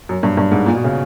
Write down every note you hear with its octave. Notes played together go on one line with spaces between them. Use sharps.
F#2
G2
G2
G#2
A#2
B2
C#3